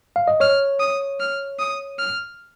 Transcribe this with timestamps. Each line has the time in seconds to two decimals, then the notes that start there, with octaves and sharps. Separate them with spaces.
0.16 F5
0.28 D#5
0.40 C#5 F6
0.79 D#6
1.20 F6
1.59 D#6
1.98 F6